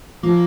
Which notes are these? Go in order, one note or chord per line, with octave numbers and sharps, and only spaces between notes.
F3 A#3